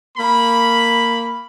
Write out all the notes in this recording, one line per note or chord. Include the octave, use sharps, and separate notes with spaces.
A#3 B5